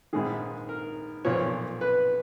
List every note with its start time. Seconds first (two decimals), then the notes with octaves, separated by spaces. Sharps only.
0.13 A#1 G#2 D#3 G#4
0.69 A#4
1.25 B1 A#2 F3 C#5
1.81 B4